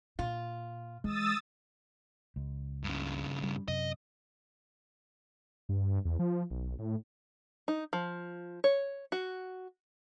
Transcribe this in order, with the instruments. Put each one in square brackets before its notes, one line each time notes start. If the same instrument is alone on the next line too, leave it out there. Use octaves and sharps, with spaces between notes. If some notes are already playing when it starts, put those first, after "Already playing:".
[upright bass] A#2 [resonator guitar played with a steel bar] F4
[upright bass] E3 [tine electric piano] G#3 [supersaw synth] D#6 E6 A6
[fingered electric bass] C#2
[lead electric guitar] G2 C#3
[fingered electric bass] G3
[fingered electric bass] F#2 C3 [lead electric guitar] D#5
[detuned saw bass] G2
E2
F3
B1
A2
[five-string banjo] D#4
F3
C#5
F#4